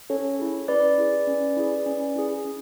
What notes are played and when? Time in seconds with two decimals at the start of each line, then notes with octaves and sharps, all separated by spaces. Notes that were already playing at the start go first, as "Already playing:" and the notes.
0.10 C#4 A4 C#5
0.39 E4 G#4
0.68 C#4 B4 D5
0.98 E4 G#4
1.27 C#4
1.57 E4 G#4
1.86 C#4
2.15 E4 G#4
2.45 C#4